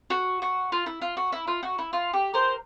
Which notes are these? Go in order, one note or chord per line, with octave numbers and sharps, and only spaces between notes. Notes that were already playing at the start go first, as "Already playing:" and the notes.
F#4
F#4
F4
E4
F4
F#4
E4
F4
F#4
E4
F4
G4
A#4 C5